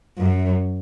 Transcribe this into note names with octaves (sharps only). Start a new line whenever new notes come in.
F#2